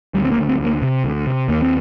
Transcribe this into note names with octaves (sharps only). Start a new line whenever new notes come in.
D2 G3
C4
A#3
D2
C4
D2
A#3
C3
D2
C3
D#2 A#3
C4